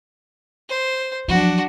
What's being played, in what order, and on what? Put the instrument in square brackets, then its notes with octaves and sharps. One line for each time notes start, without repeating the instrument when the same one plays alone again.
[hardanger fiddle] C5
[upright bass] F3 F#3 [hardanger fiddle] D4 F#4